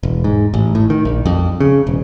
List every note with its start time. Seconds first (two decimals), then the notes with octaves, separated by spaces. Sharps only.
0.03 E1
0.24 G#2
0.54 A1
0.75 A2
0.90 D#3
1.05 A#1
1.26 F2
1.60 C#3
1.87 E1